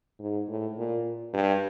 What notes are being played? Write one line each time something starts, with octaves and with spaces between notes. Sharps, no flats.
G#2
A2
A#2
G2